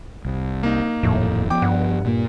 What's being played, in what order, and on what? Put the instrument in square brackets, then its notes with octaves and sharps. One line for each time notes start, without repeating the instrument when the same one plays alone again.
[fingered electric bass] C2
[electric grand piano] A#3 D#4
[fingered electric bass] D#1 F2 [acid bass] A2
[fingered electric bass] F3 B3 [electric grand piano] G5 D6
[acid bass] G2 [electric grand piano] F#5
[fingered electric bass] A#2 A#3